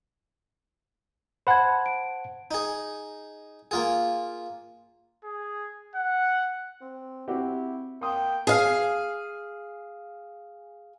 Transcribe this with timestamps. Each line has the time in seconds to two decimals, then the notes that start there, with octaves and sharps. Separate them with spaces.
1.47 C5 F#5 A5 B5 G#6
1.86 D7
2.51 D#4 G#4
3.71 A#3 F4 G#4
5.24 G#4
5.95 F#5
6.81 C4
7.28 C4 E4 F#4 G4
8.01 A#3 G5 C6 D#6
8.47 G#4 F5